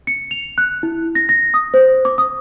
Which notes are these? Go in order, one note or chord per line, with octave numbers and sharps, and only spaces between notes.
C#7
F7
F#6
E4
A#6
A#6
D#6
C5
D6
D#6